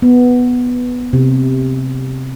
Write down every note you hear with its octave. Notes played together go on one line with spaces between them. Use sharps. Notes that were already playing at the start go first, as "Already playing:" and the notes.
B3
C3